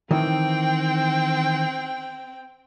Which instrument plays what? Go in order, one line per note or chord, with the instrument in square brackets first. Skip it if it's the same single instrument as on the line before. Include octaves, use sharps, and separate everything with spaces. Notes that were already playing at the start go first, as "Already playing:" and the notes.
[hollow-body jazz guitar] D#3 E3 [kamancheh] C4 G5